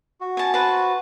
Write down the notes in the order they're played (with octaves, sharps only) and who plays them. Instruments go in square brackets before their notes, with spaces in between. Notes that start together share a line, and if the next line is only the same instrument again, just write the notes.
[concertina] F#4
[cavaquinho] G#5 A5
B4 C5 A5